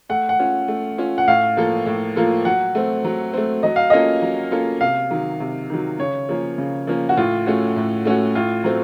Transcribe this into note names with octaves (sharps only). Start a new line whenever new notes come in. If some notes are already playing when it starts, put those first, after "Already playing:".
A3 F#5
F#5
C#4 F4
A3
C#4 F4
F#5
A2 F5
F3 A#3 F4 A4
A2
F3 A#3 F4 A4
F#3 F#5
A3 C4
F#3
A3 C4
F#3 D#5
F5
A#3 C#4 F4 A4 D#5
F#3
A#3 C#4 F4 A4
C3 F5
D#3 F#3
C3
D#3 F#3
C#3 C#5
F3 A#3 C#4
C#3
F3 A#3 C#4
F#4
A2 F4
A3 C#4 F#4
A2
A3 C#4 F#4
A2 F4
F#3 A3 C4